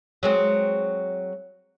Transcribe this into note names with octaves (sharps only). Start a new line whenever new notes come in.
F#3 G#3 C4